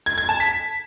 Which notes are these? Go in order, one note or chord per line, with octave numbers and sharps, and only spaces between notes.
G#6
G#6
A5
B6